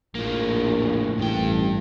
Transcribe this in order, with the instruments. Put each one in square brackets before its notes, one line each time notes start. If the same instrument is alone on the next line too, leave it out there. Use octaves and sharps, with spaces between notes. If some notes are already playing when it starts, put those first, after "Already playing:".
[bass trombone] A#1 [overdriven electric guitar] A2 A#3
[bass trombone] A1 [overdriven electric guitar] G2 G5